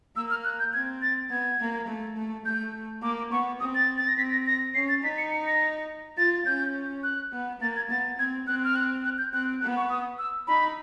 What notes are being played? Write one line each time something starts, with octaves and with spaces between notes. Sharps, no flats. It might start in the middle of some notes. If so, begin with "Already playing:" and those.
A#3 E6
F6
F#6
G6
C4 G#6
A6
B3 G#6
A#3
A3
A3
A3 G6
A#3 D6
B3 C#6
C4 D#6
A6
A6
A#6
C4 B6
A#6
A#6
C#4 C7
A6
D#4 B6
C#7
C#7
A#6
F4 A6
C#4 G6
F#6
B3
A#3 A6
G#6
B3 A6
C4 G#6
C4 F#6
F6
F#6
F#6
G6
C4 F#6
B3 F#6
C#6
D#6
E6
D#4 B5